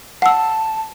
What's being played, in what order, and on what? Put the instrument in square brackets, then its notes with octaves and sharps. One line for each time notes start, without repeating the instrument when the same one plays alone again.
[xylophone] F#5 E6 [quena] A5